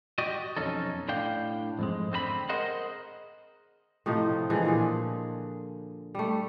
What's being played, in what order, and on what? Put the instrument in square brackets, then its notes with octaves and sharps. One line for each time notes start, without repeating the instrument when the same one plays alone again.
[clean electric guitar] F#4 G4 D5 D#5
B1 F2 C#4 D#4 A4
A2 D4 F5 G5
F2 G#2 G#3
D3 C4 A4 B5
G#4 A#4 C5 D#5 F#5
[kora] A2 C3 F3 D#4
D3 E3 F3 G#3
A#2 G#4
G3 A3